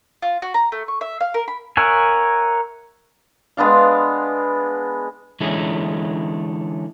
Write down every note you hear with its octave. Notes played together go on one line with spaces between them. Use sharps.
F4
F#4
A#5
A3
C#6
E5
F5
A#4
B5
A#4 C#5 E5 F#5 G#5
G#3 B3 D4 F5
D3 E3 G#3 A3 C#4